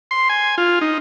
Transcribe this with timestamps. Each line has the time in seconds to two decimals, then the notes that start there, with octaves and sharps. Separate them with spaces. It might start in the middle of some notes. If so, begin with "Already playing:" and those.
0.11 C6
0.29 G#5
0.58 F4
0.81 D#4